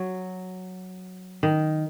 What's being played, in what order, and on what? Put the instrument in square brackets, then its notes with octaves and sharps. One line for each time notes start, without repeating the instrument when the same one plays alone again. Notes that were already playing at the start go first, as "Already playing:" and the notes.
Already playing: [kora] F#3
D#3